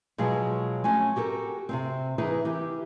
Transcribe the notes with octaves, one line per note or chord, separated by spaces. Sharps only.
B2 F3 F#3 G#3 G#4
A3 C#4 F#4 G#5
F#4 G4 A4 A#4
C3 D#3 C4
E3 D#4 G#4 A#4 B4
E3 G4 A#4